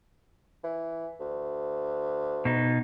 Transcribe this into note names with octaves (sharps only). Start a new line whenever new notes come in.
E3
D2
B2 D#4